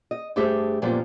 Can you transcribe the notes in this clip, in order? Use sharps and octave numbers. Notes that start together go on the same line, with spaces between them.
D#5
G2 A3 G4 G#4 C5 E5
F#2 A#2 F3 G3 B3 C5